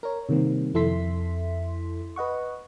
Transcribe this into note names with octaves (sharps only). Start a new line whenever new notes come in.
A#4 C#5
C3 D#3 G3 A#3 C4
F2 E4 A4 E5 C6 B6
B4 D#5 F#5 C#6